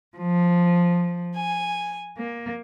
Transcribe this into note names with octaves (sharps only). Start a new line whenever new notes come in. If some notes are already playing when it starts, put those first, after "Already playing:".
F3
G#5
A#3